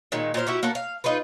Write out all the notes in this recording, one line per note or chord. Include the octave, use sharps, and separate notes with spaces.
A#2 D#3 G#3
A#2 A#4 C5 F5
E4 F#4 G4
A#3 F#4 A4 A#4
F5
D#4 F4 G#4 B4